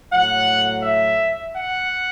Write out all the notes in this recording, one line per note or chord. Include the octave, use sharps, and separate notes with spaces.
A2 F#3 F#5
E5
F#5